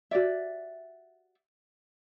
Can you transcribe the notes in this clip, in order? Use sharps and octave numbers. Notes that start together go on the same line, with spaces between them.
F#4 G4 D5 E5